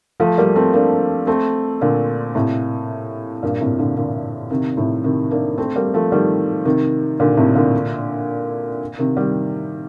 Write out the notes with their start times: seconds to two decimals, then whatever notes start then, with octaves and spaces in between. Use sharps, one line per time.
0.20 F3 A3
0.38 G3 A#3
0.55 A3 C4
0.73 A#3 D4
1.27 A3 C4
1.81 A#2 D3
2.35 A2 C3
3.43 G2 A#2
3.61 A2 C3
3.79 A#2 D3
3.97 A#2 D3
4.50 C3 D#3
4.77 A2 C3
5.04 C3 D#3
5.31 A#3 D4
5.58 A3 C4
5.76 G3 A#3
5.94 F3 A3
6.12 D#3 G3
6.65 C3 D#3
7.20 A#2 D3
7.37 A2 C3
7.55 A#2 D3
8.98 C3 D#3
9.17 D#3 G3